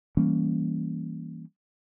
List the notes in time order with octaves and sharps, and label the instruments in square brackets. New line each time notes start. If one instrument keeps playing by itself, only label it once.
[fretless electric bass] E3 G3 A#3 C#4